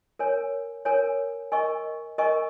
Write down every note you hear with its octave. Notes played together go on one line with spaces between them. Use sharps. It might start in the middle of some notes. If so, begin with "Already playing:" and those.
A#4 C#5 G#5
A#4 C#5 G#5
A#4 D#5 G#5 C#6
A#4 D#5 G#5 C#6